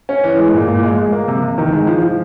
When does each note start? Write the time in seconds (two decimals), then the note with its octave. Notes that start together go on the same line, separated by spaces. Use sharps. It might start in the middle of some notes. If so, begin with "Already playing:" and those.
0.09 C#4
0.24 E3
0.38 G#3
0.54 A#2
0.68 A#2
0.83 G#3
0.98 G#3
1.12 A#3
1.28 C3
1.43 C3
1.58 D#3
1.72 G#3
1.87 F3
2.02 F3